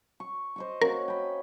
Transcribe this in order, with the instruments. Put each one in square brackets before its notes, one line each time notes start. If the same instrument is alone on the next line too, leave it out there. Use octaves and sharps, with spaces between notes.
[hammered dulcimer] C#6
C5 D#5 C#6
[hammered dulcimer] A#3 C#4 F#4 [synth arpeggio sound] A#4
[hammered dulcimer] G5 B5